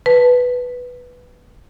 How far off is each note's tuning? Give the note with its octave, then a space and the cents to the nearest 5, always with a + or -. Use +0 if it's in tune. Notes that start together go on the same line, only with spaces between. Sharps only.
B4 +0 A5 +0